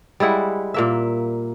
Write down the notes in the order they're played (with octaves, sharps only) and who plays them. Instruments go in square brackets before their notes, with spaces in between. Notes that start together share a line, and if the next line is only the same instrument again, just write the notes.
[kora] G3 G#3 E4 F#5
A#2 A#3 E5